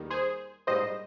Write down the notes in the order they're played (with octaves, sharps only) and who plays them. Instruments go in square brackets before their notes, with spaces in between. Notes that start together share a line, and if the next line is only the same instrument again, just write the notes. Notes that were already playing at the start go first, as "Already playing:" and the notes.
Already playing: [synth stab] D#2 D#3 G3
G#4 C5
A#1 G#2 G3 C5 D#5